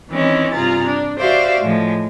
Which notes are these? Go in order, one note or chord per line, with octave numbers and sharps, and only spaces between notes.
D#3 E3 G#3 C4 C#4
G2 C3 F4 G#4 A#5 A6
D4
F#4 G4 C5 D5 E5 F5
A2 F3 G#3